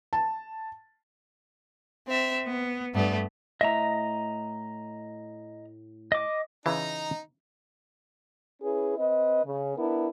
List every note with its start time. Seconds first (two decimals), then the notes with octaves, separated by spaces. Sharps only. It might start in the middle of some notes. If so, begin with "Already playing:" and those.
0.13 A5
2.06 C4 E5
2.46 B3
2.94 G2 A3 B3
3.61 A2 D#5 E5 A#5
6.12 D#5 D6
6.66 C#3 E3 D#4 A#5
8.62 C#4 E4 G#4 B4
8.97 C4 B4 D#5
9.43 C#3
9.76 B3 D4 E4 A#4